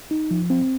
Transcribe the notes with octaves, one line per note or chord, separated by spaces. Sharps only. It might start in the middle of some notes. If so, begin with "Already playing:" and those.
D#4
F3
C4